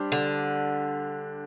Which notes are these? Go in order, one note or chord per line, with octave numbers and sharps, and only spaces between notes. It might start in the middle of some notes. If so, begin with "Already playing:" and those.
Already playing: G3 D4 G4 C5
D3